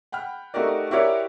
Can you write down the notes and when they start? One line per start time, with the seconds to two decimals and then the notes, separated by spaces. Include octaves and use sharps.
0.12 F#5 G5 B5 F6
0.54 A3 D#4 F#4 G4 A#4 D5
0.91 E4 F#4 G4 A#4 C#5 D5